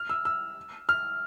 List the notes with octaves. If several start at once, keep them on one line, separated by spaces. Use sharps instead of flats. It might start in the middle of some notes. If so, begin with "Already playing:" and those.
Already playing: F6
E6
E6
F6